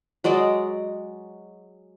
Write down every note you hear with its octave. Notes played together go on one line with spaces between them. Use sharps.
F#3 G#3 D5 D#5